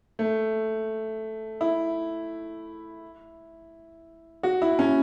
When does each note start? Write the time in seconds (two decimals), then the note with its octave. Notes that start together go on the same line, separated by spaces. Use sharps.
0.19 A3
1.61 E4
4.43 F#4
4.62 E4
4.79 C#4